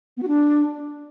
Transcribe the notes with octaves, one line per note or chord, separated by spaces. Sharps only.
B3
F#4
D4